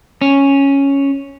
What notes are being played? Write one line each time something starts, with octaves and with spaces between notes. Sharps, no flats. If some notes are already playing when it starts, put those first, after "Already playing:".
C#4